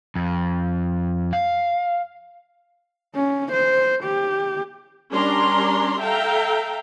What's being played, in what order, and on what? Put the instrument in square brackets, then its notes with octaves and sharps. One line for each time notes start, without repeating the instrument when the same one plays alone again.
[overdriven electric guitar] F2
F5
[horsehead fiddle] C#4
C5
G4
[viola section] G3 C#4 D4 A#4 A#5 C6
A4 E5 F5 G5 A#5